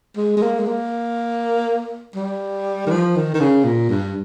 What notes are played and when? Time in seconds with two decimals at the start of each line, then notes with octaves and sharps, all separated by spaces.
0.17 G#3
0.37 G#3
0.43 A#3
0.60 G#3
0.68 A#3
2.16 G3
2.87 D#3
2.91 F3
3.16 D#3
3.35 D#3
3.40 C#3
3.65 A#2
3.90 G2